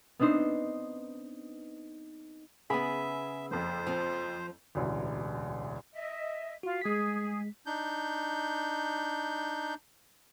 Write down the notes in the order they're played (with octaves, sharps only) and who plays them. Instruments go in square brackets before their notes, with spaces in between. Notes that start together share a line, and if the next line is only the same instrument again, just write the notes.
[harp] B3 C4 D4 D#4 C5
[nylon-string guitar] C#3 B3 [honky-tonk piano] G#4 [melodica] E5 [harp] B5 D#6
[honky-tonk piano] F#1 F2 [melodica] C5
[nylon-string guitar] F3 C4
[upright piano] E1 A1 D2
[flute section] D#5 E5
[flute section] F4 [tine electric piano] F#4
[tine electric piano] G#3 B6 [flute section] G#4
[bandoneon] D4 D#4 G6